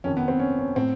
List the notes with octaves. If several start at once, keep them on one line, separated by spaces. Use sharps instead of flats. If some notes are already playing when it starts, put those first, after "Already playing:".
F2 C3 D#3 C#4
B3
C4
C#4
C#4
A2 C4